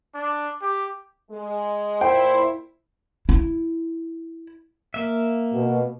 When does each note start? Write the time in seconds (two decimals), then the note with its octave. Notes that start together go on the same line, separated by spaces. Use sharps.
0.15 D4
0.62 G4
1.31 G#3
2.01 A#2 E4 C5 G5
3.29 E4
4.94 A#3 E5
5.53 B2